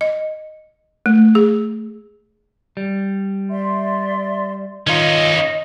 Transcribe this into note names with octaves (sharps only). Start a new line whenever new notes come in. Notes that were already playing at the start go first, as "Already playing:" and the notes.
D#5
A3
G#4
G3
D5 E5 C6
D#3 C#4 D#4 F4 D#5